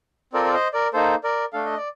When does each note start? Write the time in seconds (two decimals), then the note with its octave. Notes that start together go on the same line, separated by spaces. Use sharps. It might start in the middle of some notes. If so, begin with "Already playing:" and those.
0.33 C4 F4 A4 A#4 D5
0.45 D5
0.54 C5 D#5
0.73 A#4 D5
0.94 A#3 D#4 A4 C5
1.24 A#4 D5
1.53 A3 D4 A4 F5
1.66 D#5
1.77 D5